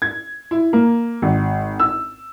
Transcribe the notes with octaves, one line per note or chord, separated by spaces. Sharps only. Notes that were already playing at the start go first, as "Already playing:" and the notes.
G#6
E4
A#3
G#1
E6